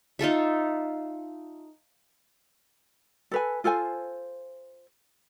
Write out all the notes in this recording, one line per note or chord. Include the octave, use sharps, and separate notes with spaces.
D#4 F4 A4 E5
A4 B4 G#5
F4 A4 C5 G#5